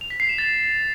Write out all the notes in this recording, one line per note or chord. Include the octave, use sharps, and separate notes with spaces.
F7
B6
C7
E7
A6